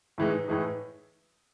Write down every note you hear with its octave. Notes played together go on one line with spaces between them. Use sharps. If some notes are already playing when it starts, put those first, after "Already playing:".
A2 E3 G#3 D#4
A2 E3 G#3 D#4